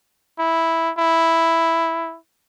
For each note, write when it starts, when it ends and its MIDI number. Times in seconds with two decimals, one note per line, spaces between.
0.39 0.92 64
0.98 2.17 64